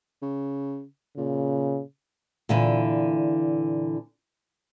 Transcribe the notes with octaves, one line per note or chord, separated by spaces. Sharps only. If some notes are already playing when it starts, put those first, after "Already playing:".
C#3
A#2 C#3
A#2 D3 E3